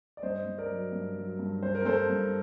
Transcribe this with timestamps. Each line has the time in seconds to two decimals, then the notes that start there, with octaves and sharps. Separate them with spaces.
0.17 D5
0.22 G2 C5 D#5
0.46 G2
0.58 A#4 D5
0.70 F#3
0.92 G2
1.16 F#3
1.39 G2
1.63 G2 C5
1.75 A#4
1.85 G2 A4 C5
2.09 G2